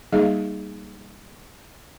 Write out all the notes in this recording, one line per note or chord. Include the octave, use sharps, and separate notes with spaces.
G3 A#3 D#4 G#4 D#5 F5